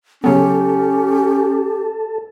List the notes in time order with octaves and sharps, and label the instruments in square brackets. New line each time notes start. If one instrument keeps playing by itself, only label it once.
[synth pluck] C#3 F#3 B3 [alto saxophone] C#4 [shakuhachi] G4 [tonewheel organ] A4